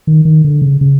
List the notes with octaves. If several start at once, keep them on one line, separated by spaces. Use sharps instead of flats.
D#3
D#3
D3
C#3
C#3